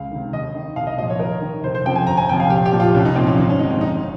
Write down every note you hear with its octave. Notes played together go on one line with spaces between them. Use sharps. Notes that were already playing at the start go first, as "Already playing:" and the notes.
Already playing: C#2 F5
C3 D#3
D#2 D#5
D#3
C2 F5
D#5
A#2 F3 D#5
C#5
D#2 A#4
D#3
F1 C5
C5
F2 C#3 F3 G5
G#5
G1 A#5
G#5
F2 C3 F3 G5
F5
A#1 G4
G4
A#2 F3
F4
C2 C#4
D#4
A#2 F3 C4
C#4
G#1 D#4
C#4
G#2 F3 D#4
C4
G1 D#4